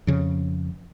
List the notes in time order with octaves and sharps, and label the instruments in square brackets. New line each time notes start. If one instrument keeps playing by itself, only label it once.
[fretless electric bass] F2 C#3